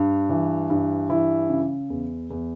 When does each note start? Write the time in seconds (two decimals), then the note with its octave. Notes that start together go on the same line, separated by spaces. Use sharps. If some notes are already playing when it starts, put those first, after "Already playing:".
Already playing: G2
0.29 E3
0.70 G2
1.09 E3 E4
1.49 C#3
1.90 E2
2.30 E2